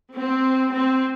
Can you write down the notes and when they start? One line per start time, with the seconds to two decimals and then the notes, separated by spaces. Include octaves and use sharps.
0.14 C4
0.70 C4